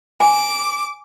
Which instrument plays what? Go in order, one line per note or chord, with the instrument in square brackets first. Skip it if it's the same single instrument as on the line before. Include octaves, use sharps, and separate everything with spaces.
[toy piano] G#5 [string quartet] D6